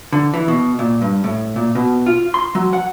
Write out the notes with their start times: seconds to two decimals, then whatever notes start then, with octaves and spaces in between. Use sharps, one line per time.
0.12 D3
0.34 E3
0.48 B2
0.79 A#2
1.02 G2
1.24 A2
1.56 A#2
1.75 B2
2.06 F4
2.34 C6
2.55 F#3
2.73 F#5